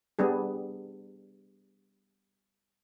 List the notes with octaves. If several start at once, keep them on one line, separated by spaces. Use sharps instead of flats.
G3 B3 D4 G#4